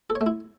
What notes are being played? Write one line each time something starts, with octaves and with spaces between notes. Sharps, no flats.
A4
C#5
A3
E4